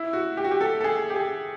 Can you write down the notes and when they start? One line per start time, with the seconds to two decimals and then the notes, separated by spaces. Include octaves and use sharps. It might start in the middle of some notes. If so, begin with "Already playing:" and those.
Already playing: E4
0.13 F#4
0.37 G4
0.44 F#4
0.51 G4
0.61 A4
0.80 A4
0.84 G#4
1.10 G4
1.16 G#4